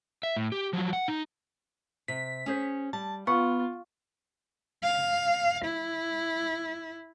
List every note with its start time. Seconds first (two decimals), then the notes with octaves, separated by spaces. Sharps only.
0.23 E5
0.37 A2
0.52 G4
0.73 F3 F#3
0.93 F#5
1.08 D#4
2.08 C3 B6
2.46 C#4 G#4 C5
2.93 G3 A5
3.27 B3 F4 F#5 C#6
4.83 F5
5.65 E4